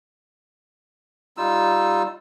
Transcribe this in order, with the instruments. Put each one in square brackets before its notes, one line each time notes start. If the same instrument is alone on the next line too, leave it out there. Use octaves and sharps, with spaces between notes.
[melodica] G3 D#4 F4 E6